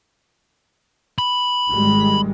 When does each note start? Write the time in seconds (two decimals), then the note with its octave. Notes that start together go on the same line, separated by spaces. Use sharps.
1.18 B5
1.69 G#1 G3 G#3